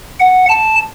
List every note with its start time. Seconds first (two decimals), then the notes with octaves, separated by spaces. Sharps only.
0.20 F#5
0.49 A5